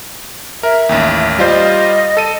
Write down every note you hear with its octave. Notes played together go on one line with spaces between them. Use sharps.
A#4 E5
A1 D#2
G3 F4 C5 D#5
A4 D#7